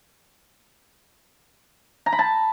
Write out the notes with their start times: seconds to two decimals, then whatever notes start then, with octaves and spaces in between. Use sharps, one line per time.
2.06 A#5
2.12 B5
2.19 A5